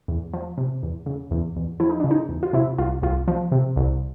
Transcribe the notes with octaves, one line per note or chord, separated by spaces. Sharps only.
E2
F3
C3
E2
C#3
E2
E2
F3 E4
D#4
C#3 D4
D#4
E2
F4
C3 E4
C2 F4
C2 F4
F3
C3
C2